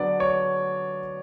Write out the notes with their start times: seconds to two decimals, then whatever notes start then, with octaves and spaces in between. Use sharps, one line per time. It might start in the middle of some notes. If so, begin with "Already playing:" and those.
Already playing: D3 F#3 B3 D5
0.20 C#5